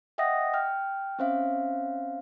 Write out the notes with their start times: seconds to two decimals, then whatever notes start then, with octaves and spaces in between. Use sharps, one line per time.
0.18 D#5 E5 F#5 G5 D#6 A#6
0.54 G5 F6
1.19 C4 C#4 C5 E5 F5